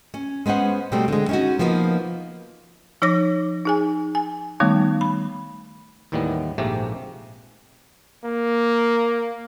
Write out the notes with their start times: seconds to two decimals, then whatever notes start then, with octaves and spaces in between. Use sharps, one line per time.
0.14 C#4
0.46 G#3 B3 C#4 C5 F#5
0.92 B2 G3 A3 C4
1.08 D3 G#3
1.29 C#4 D#4 F#4
1.59 F3 A#3 B3 C#4 D#4
3.02 F3 D#4 C#5 D6 A#6
3.66 D#4 G#4 G#5
4.15 G#5
4.60 D#3 G3 A3 B3 D#4
5.01 B5
6.12 D#2 A2 D#3 E3 G3 B3
6.58 A#1 G#2 C3 A3 A#3 G4
8.25 A#3